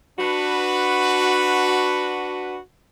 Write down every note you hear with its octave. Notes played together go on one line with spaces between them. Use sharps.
D4 F#4 B4